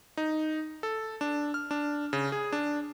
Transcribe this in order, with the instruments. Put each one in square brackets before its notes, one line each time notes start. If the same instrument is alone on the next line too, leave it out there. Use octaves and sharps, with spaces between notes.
[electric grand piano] D#4
A4
D4
F6
D4
C#3
G#4
D4